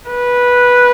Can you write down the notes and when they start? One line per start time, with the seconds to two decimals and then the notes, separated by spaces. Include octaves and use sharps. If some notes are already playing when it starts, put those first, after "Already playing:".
0.10 B4